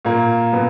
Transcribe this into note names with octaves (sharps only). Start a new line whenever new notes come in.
A#2 A#3
B2 B3